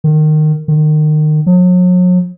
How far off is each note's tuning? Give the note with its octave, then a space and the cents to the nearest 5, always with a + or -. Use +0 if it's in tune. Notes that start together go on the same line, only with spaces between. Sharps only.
D#3 -20
D#3 -30
F#3 -40